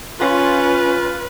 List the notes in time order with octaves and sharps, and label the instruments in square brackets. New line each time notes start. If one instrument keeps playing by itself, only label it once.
[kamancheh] C#4 [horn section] F4 [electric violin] B4